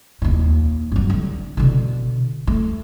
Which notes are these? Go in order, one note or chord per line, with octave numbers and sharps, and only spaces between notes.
D#2 A#2
G2 F#3
D3
B2 D3
A3